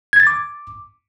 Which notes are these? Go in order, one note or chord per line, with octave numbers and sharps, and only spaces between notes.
G#6
A6
D6